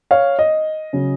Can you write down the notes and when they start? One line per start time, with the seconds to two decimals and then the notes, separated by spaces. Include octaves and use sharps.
0.11 C#5 F5
0.39 D#5
0.93 C#3 F#3 C#4